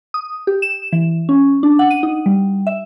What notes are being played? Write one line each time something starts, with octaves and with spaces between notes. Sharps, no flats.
D#6
G4
E7
E3
C#4
D4
F#5
D#7
D#4
G3
E5